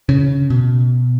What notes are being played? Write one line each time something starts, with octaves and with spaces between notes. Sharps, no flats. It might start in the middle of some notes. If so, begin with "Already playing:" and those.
C#3
B2